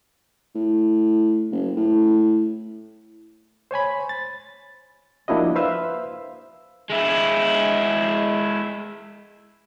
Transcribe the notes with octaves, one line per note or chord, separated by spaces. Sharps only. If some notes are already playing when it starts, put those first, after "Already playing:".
A2
F#1
A2
C5 C#5 G#5 B5
A6
F3 A#3 D4 E4 F#4 D#5
B4 C5 E5 F5 E6
G#3 E4